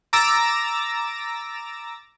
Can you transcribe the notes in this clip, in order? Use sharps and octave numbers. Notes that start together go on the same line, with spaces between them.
A#5 D6 E6 A6 A#6